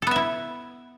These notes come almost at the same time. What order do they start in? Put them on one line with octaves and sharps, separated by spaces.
A4 B3 E5 E4